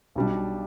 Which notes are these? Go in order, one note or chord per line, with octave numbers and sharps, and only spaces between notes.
B1 B2 G3 D4